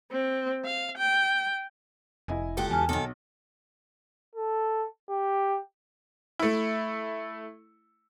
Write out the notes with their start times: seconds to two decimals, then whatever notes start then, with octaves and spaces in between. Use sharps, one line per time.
0.12 C4
0.65 F5
0.97 G5
2.28 F1 E4 D#5 G#5
2.57 C#2 F#4 G4 A4 G5
2.70 E2 G#5 A5 F6
2.89 B1 D#3 A4
4.35 A4
5.09 G4
6.39 A3 E4